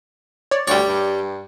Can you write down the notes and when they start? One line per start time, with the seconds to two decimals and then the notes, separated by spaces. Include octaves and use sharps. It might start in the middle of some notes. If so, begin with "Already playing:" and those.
0.51 C#5 D5
0.68 D2 G3 C#5 D5
0.87 G2